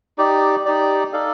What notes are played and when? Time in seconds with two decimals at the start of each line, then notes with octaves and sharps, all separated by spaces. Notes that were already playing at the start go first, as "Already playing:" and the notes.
0.18 D#4 G4 D5
0.65 D#4 G4 D5
1.13 D#4 A4 D5 F5